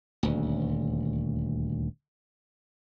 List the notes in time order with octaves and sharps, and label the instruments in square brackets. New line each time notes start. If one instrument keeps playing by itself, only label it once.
[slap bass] D#1 D2